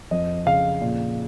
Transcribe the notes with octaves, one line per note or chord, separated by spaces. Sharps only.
F2 D#5
C#3 F5
A#2